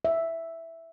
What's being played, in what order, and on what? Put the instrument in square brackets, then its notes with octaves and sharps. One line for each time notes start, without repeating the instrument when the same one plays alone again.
[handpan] E5